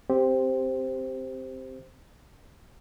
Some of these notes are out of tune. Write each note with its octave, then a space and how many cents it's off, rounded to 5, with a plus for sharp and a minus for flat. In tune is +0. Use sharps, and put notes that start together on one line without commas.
C4 +0 G4 +0 C5 +0